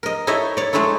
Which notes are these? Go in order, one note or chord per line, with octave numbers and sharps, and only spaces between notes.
A#4 D#5
D#4 E4 A4 C#5 D#5 E5
C#5 D5
G#3 A3 D#4 E4 A4